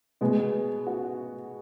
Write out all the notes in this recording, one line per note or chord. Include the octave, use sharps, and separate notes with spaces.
B2 G#3 B3
F#4